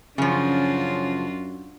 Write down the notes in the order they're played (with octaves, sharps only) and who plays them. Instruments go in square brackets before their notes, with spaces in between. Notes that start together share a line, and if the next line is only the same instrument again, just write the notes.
[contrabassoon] F#2 [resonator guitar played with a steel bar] C#3 F3 [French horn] C#4 [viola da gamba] D4 F4 F#4